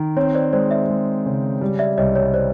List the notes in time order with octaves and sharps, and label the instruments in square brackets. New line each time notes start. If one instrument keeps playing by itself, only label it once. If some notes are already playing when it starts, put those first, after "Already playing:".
Already playing: [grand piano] D#3
[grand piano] C4 [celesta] C#5
[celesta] C5 D5
[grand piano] G#3 [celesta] C5 D5
[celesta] D5 E5
[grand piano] G#3
C#3
G3
[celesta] D5 E5
[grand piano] C2 [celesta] C#5 D#5
[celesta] C#5
C5 D5